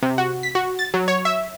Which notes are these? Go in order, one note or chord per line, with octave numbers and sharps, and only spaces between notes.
C3
F#4
B6
F#4
A6
F#3
C#5
E5